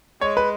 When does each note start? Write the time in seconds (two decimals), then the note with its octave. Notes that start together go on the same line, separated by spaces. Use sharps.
0.21 G#3 C#5
0.37 B4